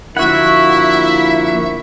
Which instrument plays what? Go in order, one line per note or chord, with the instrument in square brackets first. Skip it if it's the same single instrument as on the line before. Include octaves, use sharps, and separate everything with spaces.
[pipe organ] D3 F3 A#3 [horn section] E4 [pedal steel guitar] F#4 F#5 [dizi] E5